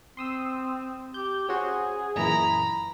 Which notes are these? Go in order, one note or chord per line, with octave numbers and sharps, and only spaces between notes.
C4 C6 D#6 E6
G4 G6
C#4 F#4 G#4 C5
F#2 A#2 E3 A#5 B5